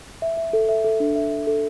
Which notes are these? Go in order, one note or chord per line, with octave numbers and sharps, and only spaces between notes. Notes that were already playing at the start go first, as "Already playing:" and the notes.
E5
E5
A4
E5
A4
D4
E5
E5
A4